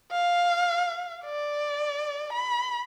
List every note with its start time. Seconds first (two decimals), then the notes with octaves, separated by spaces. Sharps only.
0.12 F5
1.25 D5
2.33 B5